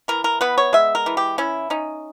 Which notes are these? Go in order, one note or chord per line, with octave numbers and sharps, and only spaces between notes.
E3 A#4
A#4
B3 B4
C#5
G#3 E5
A#4
E3
G4
C#4 E4
C#4 D#4